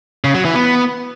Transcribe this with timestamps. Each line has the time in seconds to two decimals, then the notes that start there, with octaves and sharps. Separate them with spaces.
0.24 C#3
0.35 F#3
0.45 E3
0.55 B3